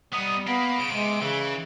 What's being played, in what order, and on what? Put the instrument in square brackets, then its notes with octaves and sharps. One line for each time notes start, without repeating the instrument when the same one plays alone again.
[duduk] G3 [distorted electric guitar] B3 D#4 [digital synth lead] D#6
[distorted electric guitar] A#3 [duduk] B3 [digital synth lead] B5
[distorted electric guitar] C#3 [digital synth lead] D7
[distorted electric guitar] C3 [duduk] G#3
[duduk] C#3 [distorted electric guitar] E3